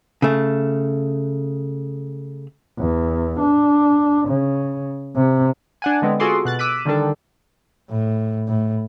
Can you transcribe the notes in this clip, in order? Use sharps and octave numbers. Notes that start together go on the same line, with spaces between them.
C#3 A3
E2
D4
C#3
C3
D4 F#5 G#5
D3 G#3 B3 C4
F4 F#4 G#4 A4 C6 D6
B2 F#6 A6
D6 E6 F#6 B6 D#7
D3 D#3 G3 D4 A4
A2
A2